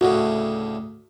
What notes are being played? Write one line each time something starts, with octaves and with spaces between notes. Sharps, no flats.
D2 A2 C#3 F#4